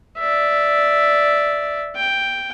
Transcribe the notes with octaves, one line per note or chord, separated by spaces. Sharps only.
D5 E5
G5